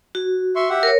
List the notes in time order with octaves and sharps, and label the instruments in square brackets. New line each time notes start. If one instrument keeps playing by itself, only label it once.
[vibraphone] F#4
[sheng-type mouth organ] E5 C6 C#6
G4 E5 F#5
[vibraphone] A#4 C#5